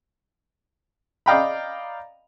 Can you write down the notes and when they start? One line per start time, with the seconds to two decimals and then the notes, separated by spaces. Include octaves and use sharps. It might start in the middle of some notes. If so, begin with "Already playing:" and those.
1.26 D5 D#5 F5 G5 A#5 B5